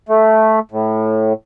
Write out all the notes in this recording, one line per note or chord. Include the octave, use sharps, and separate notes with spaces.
A3
A2